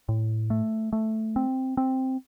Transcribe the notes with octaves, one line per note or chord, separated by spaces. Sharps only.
A2
A3
A3
C4
C4